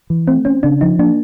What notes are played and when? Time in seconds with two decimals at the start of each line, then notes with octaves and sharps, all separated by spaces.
0.10 E3
0.28 A3 C4
0.45 C4 C#4
0.63 C#3 D4
0.81 F3 D#4
0.99 A#3 D4